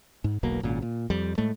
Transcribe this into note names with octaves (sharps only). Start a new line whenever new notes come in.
G#2
E1 B1 B2 A#3
G#1 A#2 C#3
A#2
F2 G3
A2 G#3 A3